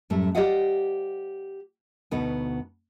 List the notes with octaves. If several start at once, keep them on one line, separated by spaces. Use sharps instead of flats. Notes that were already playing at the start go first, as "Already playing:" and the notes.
F#2 A2 G3 A3
G4 C5 D5 D#5 F5 F#5
D2 B2 B3 D#4 B4